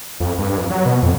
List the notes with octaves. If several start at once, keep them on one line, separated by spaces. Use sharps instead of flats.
F2
G2
F2
F#3
B2
F2